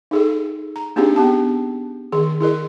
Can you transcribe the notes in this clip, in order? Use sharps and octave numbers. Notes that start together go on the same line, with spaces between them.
D#4 G#4 A4
A#5
A#3 C4 D4 D#4 G4 G#4
B3 G4 A5
D#3 G#4
E4 G#4 A#4 D#5